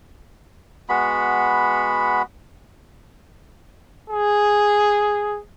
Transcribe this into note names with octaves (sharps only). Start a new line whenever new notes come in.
G#3 B3 F#4 B5
G#4